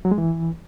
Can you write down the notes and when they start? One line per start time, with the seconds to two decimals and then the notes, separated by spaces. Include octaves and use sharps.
0.05 F#3
0.11 G#3
0.18 E3